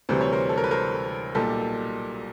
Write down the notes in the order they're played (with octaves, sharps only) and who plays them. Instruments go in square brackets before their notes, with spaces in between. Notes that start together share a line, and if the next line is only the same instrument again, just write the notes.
[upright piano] D2 C3 E3 G3 C5
C#5
A#4 C5
A4
A#4
B4
A#4 C5
B1 A#2 G3 G4 A4